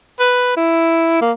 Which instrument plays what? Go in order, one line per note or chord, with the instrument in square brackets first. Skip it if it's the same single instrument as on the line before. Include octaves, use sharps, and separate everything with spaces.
[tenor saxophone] B4
E4
A#3